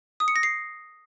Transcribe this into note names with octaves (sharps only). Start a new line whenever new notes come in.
D#6
C#7
A#6
C7